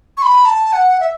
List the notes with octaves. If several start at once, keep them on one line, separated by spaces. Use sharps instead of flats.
C#6
B5
A5
F#5
E5